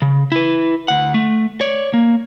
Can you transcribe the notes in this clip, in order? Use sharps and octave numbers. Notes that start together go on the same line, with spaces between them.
C#3
E4 B4
D2 F#5
A3
C#5 D5
A#3